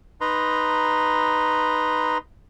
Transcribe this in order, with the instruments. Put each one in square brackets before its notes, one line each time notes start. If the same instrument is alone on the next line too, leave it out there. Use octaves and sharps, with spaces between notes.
[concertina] D#4 B4 A#5 C6